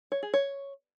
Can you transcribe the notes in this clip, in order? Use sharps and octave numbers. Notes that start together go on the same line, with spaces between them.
C#5
G#4
C#5